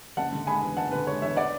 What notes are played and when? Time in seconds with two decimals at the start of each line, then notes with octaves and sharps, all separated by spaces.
0.17 F#1 F#5 A5
0.32 D3
0.47 G#3 G#5 B5
0.62 E2
0.77 F#1 F#5 A5
0.92 D3 B4
1.07 G#3 C#5
1.22 E2 C#5 E5
1.37 D5 F#5